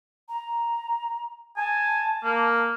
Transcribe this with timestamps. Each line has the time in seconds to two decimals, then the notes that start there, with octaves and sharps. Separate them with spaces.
0.29 A#5
1.57 G#5 A5
2.24 A#3